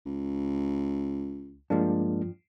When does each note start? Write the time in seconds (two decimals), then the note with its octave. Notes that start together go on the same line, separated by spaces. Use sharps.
0.06 C#2
1.70 G2 F3 G#3 A#3 D4